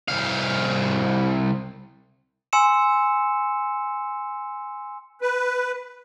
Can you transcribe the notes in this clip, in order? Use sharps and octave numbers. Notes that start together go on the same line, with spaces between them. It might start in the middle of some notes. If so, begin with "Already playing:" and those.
C2 F5
G#5 C6 E6 C#7 E7
B4